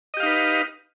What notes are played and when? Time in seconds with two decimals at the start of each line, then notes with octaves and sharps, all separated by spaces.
0.14 D#5
0.17 G4
0.20 F5
0.23 D#4
0.26 B4